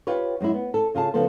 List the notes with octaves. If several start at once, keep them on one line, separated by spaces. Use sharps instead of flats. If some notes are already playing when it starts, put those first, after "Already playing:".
F4 G4 B4 C#5
F#2 G#3 D#4 E4
B3
A4
C#3 F4 G#4 A5
C#3 F3 B3 A4 C5